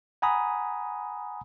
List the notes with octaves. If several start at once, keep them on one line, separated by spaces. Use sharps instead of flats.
F#5 G#5 A#5 B5 D#6